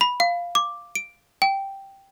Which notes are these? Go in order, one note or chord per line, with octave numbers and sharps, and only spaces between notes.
B5
F5
D6
D7
G5